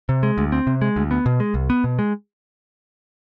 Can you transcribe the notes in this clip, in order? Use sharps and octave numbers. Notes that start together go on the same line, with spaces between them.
C3
G#3
D2
C4
C3
G#3
D2
B3
B2
G#3
C2
B3
B2
G#3